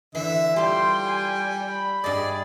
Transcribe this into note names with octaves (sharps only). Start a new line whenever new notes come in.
D3 E3 E5
G3 F4 A4 G5 C6
G#5
B5
G2 G#4 D5 D#5